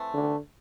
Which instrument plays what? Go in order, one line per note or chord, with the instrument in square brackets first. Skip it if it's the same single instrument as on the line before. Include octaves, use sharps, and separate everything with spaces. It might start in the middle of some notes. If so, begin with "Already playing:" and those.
Already playing: [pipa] E3 A3 C4
[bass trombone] D3